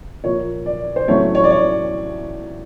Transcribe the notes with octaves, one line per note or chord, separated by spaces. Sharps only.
A#2 F3 A#3 C#5
D5
C5
A2 F#3 A3 C#4 C#5
C#5
D5
C#5